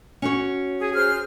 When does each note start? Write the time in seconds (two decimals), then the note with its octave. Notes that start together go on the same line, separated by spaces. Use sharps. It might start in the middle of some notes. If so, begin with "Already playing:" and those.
0.22 C#4 F#4 C#5
0.81 G#4
0.95 G#4 C5 F6